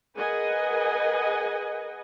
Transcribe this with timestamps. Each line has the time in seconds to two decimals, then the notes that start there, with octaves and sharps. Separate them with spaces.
0.16 G#4 A#4 B4 D#5 F#5 G#5